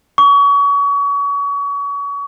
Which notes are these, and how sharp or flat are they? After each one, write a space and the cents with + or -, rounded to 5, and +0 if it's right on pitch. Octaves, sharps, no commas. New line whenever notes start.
C#6 +35